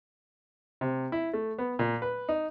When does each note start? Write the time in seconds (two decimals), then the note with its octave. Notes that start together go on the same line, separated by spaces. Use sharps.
0.81 C3
1.12 E4
1.34 A3
1.58 B3
1.79 A#2
2.02 B4
2.29 D#4